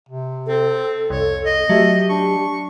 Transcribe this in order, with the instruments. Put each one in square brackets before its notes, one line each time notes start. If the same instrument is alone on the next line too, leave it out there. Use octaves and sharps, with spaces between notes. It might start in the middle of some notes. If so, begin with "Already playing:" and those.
[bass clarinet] C3
[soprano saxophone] C4 [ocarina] A4
[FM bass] C2 [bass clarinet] F2 [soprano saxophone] C#5
[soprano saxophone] D#5
[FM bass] F#3 [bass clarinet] A3 [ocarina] G4
[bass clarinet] D4 [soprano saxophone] C#6